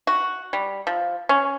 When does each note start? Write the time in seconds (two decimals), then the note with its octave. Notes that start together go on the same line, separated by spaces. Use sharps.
0.07 F#4
0.53 G3
0.87 F3
1.29 C#4